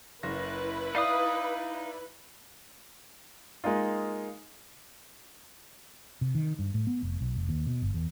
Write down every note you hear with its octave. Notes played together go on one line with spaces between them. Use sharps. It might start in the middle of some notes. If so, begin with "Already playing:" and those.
F#1 E4 B4 A#6
D#4 D5 E5 F5 D#6
G#3 A#3 D#4 F4
C3
D#3
G2
A2
B3
F1
B1
F1
D#2
B2
G1
E2